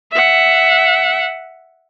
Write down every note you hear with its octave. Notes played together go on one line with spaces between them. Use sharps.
E5 F#5